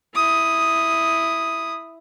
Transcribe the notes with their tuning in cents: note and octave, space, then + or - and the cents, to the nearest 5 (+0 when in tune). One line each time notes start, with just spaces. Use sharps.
E4 +0 D#6 +0